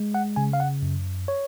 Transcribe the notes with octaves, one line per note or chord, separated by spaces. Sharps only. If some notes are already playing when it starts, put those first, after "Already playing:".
Already playing: G#3
F#5
C#3 G#5
F5
F#5
F#2
C#5